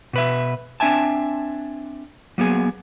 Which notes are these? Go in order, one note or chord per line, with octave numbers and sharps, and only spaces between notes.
B2 B4 E5
C4 D4 E5 G#5 A5
F#3 A#3 B3 G#4